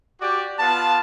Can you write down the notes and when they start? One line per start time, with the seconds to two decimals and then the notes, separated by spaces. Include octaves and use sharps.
0.20 F#4 G4 D5 D6
0.59 B3 F4 F5 A5